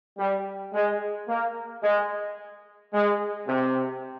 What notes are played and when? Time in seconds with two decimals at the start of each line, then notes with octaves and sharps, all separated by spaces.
0.18 G3
0.73 G#3
1.28 A#3
1.83 G#3
2.93 G#3
3.47 C3